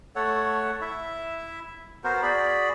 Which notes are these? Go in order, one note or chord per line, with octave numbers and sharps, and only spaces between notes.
A3 A4 C#5 F#5
E4 E5
B3 F#4 A#4 C5
F#4 G#4 D5 B5